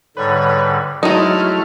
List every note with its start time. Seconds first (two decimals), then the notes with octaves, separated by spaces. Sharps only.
0.17 G#2 D3 G3 B4 C#5
1.03 F#3 G#3 A3 D#4 E4 F6